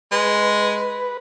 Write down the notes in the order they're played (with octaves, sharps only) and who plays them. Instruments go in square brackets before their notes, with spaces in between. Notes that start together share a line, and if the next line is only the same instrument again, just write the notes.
[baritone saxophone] G#3 [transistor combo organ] B4